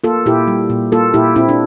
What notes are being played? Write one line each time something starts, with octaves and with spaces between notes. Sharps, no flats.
A#3 F4 A4
A#2 E4 G4
G3
A#2
A#3 F4 A4
A#2 E4 G4
A#2 C4 E4
D4